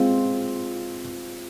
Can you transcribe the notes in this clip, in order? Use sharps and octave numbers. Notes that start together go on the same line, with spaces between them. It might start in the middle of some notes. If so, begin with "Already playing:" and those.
Already playing: G#3 C4 F4